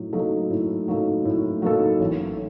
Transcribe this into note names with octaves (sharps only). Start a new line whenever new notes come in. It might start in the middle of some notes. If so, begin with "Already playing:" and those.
Already playing: A2 F#3 D#4
F#3 A#3 D#4 A4
A2
F#3 A#3 D#4 A4
A2
F#3 A#3 D#4 A4
A1